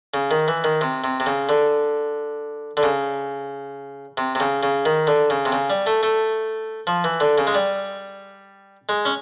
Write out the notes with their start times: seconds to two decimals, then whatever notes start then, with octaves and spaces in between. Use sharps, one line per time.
0.14 C#3
0.31 D#3
0.48 E3
0.64 D#3
0.81 C3
1.04 C3
1.20 C3
1.26 C#3
1.49 D3
2.77 D3
2.83 C#3
4.17 C3
4.35 C3
4.40 C#3
4.63 C#3
4.85 D#3
5.07 D3
5.30 C#3
5.45 C3
5.52 C#3
5.70 G3
5.86 A3
6.03 A3
6.87 F3
7.04 E3
7.20 D3
7.38 C#3
7.47 G#3
7.55 G3
8.89 G#3
9.05 C#4